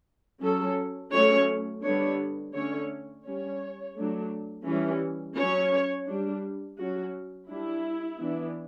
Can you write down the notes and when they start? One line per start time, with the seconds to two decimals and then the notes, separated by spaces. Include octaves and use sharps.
0.42 F#3 C#4 A4
1.13 F#3 A3 C#4 C#5
1.83 D3 G3 B3 D4 C#5
2.54 D3 A3 C#4 C#5
3.25 G3 C#4 C#5
3.96 F#3 A3 D4
4.66 E3 G3 C#4
5.37 F#3 C#4 C#5
6.08 G3 D4
6.78 F#3 C#4 F#4
7.49 G3 D4 E4
8.19 E3 B3 D4